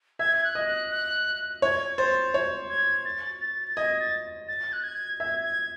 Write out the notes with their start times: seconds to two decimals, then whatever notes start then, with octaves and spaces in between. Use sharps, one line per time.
0.19 E5 G#6
0.37 G#6
0.44 F#6
0.55 D#5
0.67 F#6
0.91 F#6
1.62 C#5 G#6
1.98 C5 A6
2.34 C#5
2.70 G#6
3.05 A6
3.41 A6
3.69 A6
3.76 D#5 G#6
4.00 A6
4.48 A6
4.73 F#6
4.83 G#6
5.20 E5 G#6
5.43 G#6